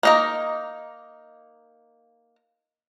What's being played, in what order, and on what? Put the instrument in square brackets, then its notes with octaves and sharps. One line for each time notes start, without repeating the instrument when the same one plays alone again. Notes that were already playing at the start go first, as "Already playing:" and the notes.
[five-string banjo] A#3 D#4 A#4